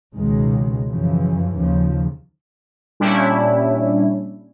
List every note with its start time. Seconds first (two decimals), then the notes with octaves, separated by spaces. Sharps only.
0.14 C#2 B2 D#3 G#3
0.88 F#2 C#3 E3 F3
1.57 D#2 C#3 F3
3.00 A#2 G3 C#4 D4 E4